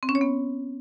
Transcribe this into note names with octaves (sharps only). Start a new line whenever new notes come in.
C4
C#4
C#5
B3